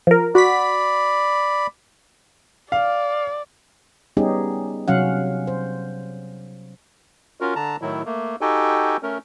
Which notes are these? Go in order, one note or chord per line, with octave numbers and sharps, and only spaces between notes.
F3 A#4
F#4 D5 B5 B6
D5 F5
G3 B3 C#4 D#4 G4 G#4
C3 F#3 C#4 F5 F#5
C5
C#4 F4 F#4 A#4
D3 A5 A#5
A2 D#3 F#3 E4
A3 A#3
D#4 F#4 G4 A4 G5 G#5
A3 C#4 A#4